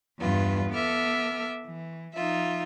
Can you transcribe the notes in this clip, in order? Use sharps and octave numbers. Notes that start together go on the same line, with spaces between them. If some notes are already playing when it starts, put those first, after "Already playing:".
E2 G2 F4 B4
B3 A4 E5 D6 F6
E3
F3 D#4 F4 E5